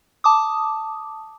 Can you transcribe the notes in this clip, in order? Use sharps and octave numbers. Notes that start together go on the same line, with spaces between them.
A5 D6 D#6